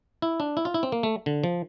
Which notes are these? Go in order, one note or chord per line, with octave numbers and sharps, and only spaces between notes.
E4
D4
E4
F4
E4
C4
A#3
A3
D3
F3